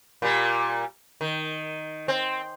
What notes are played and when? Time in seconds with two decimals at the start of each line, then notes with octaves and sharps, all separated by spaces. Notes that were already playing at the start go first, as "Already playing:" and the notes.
0.22 A#2 G3
1.21 D#3
2.08 C4